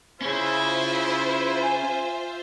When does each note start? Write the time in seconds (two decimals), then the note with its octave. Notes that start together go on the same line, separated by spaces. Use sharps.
0.21 C#4 E4 F4 G#4 C5 E5
1.62 G#5